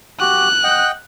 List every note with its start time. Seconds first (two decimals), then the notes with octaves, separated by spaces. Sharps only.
0.20 F#4 G4 F#6
0.64 D#5 F#5 G5